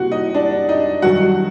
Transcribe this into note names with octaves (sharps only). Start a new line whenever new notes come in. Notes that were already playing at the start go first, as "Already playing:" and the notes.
Already playing: C3 G3 A#3 F#4 F#5
D#4 D#5
D4 D5
D#4 D#5
G2 D#3 F#3 F#4 F#5